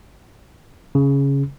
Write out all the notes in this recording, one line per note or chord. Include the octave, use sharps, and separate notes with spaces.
C#3